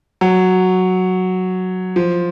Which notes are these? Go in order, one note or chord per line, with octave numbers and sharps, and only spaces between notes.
F#3
F3